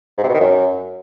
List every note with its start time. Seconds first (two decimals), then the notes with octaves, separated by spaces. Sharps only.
0.18 G#2
0.23 C3
0.29 B2
0.34 D#3
0.40 F#2